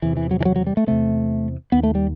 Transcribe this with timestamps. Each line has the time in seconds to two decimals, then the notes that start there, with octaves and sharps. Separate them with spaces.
0.02 E2 C3 E3
0.17 E3
0.31 F#3
0.40 E3
0.45 F#3
0.56 F#3
0.67 G3
0.77 A3
0.87 E2 C3 A3
1.72 D#2 B3
1.83 A3
1.95 G3